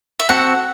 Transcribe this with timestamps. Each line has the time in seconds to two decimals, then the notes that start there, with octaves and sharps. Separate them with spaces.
0.20 E5
0.29 C4 F#4 A4 F#5